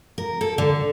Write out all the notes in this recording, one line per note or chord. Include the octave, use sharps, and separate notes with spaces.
A#4
A4
D3